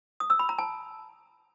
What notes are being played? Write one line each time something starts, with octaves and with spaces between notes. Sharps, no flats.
D#6
E6
B5
A#5
A5